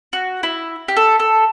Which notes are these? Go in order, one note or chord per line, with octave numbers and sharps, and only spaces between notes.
F#4
E4
G4
A4
A4